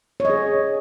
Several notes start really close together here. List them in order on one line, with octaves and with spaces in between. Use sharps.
C#5 D#5 G#4